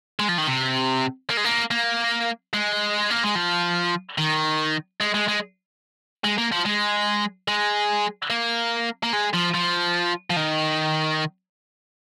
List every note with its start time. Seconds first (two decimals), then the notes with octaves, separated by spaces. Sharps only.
0.19 G#3
0.29 F3
0.38 D#3
0.47 C3
1.30 A#3
1.37 G#3
1.44 A#3
1.71 A#3
2.53 G#3
3.11 A#3
3.24 G#3
3.36 F3
4.18 D#3
5.00 G#3
5.14 G#3
5.28 G#3
6.24 G#3
6.38 A#3
6.52 F3
6.65 G#3
7.48 G#3
8.30 A#3
9.03 A#3
9.13 G#3
9.33 F3
9.54 F3
10.30 F3
10.36 D#3